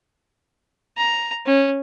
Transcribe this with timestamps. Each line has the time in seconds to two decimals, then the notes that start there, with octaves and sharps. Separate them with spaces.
0.97 A#5
1.46 C#4